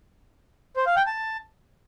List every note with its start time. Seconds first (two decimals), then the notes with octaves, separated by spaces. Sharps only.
0.76 C5
0.86 F5
0.96 G5
1.06 A5